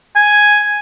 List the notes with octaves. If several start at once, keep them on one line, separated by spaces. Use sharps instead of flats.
G#5